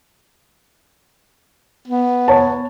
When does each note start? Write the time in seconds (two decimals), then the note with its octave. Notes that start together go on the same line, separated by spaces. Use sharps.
1.88 B3
2.28 C#5 A5